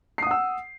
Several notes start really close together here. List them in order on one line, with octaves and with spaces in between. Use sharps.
C7 D#6 F#5 E6